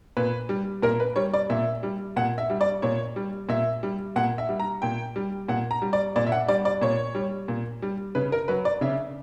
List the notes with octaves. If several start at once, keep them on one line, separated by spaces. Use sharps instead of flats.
A#2 B4
G3
A#2 A#4
B4
G3 C#5
D5
A#2 E5
G3
A#2 F#5
E5
G3
D5
A#2 C#5
G3
A#2 E5
G3
A#2 F#5
E5
G3
A#5
A#2 G5
G3
A#2 F#5
A#5
G3
D5
A#2 D5
E5
F#5
G3 D5
D5
A#2 C#5
G3
A#2
G3
C#3 B4
A#4
F#3 B4
D5
C#3 E5